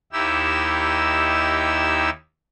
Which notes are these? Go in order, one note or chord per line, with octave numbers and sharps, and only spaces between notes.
D#2 D#4 E4 G4 E6